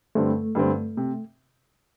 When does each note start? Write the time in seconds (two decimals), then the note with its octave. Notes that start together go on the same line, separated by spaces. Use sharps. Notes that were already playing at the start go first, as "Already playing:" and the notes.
0.15 G2 D3 G3 A3 C4
0.55 G2 D3 G3 C4
0.97 C3